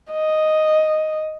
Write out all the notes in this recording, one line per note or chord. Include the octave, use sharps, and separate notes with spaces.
D#5